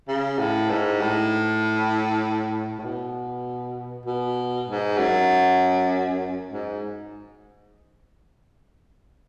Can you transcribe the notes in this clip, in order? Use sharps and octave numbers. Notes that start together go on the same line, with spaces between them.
C#3
A2
G#2
A2
A2
B2
B2
G#2
F#2
G#2